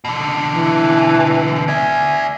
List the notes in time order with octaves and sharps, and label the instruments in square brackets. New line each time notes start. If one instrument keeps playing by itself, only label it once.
[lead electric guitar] B2 D3
[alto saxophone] E3
[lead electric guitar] D5 E5 [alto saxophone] G#5